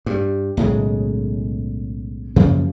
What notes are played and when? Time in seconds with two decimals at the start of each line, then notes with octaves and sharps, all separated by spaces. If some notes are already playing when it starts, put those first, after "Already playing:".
0.06 G2
0.57 B1 A2 C#3 G#3
2.36 F#2 C#3 F3 A#3